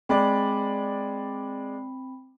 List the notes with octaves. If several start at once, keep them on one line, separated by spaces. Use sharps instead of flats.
G#3 C4 D5 B5